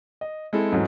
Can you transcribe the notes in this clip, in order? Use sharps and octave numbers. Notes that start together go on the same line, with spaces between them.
D#5
G#3 C4 E4 A4
G#2 E3 F#3 A3 C#4